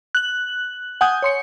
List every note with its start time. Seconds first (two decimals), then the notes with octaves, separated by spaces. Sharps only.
0.15 F#6 F#7
1.01 F#5 G#5 D#6 G6
1.22 C#5 C6 C#7